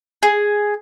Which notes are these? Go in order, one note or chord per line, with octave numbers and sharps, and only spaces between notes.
G#4